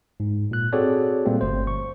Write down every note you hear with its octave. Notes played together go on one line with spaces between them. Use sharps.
G#2
A#2 F#6
C4 F#4 G#4 A4 C#5 D5
A#2 G3 A3 A#3 C4
G1 C5
C#6